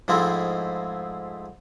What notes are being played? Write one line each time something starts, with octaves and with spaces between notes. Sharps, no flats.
G#2 F3 G#3 A3 C4 E4